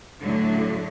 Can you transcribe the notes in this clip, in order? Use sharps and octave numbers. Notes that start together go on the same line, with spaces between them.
A2 D3 F#3